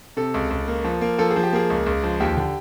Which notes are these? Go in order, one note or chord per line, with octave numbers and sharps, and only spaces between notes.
C3 A4
C#2
C#2
A#3
F3
A#3
F3 A4
G#4
F3
G4
A#3 G#4
C#2
C#2
F3
D#2 G4
D3